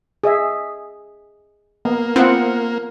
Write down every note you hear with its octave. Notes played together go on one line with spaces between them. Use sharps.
G#4 D#5 E5
A#3 B3
B3 C4 F4 F#5